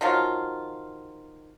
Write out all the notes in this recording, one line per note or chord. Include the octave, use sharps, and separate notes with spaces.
D#3 F3 F#3 F4